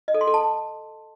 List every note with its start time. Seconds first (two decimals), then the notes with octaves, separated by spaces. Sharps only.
0.08 D#5
0.14 A4
0.21 C6
0.27 A4
0.34 A5